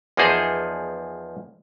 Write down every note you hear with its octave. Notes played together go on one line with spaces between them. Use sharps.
E2 F3 A#3 D#4 G#4 C5